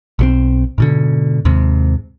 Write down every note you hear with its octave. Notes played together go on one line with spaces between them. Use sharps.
B1 F#3 C4
G#2 B2 D3
D#2 G#2 C3